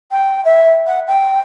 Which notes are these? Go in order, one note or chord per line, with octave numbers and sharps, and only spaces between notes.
G5
E5
F#5
G5